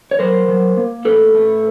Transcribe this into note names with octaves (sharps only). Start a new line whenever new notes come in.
C#5
F#3 A#4 C5
F#3
A#3
A2 A4 B4
A3